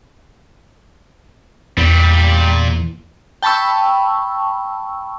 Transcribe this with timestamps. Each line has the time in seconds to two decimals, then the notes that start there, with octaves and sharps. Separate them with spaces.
1.78 E2 A#2 G3
3.42 G5 A5 B5 C#6 E6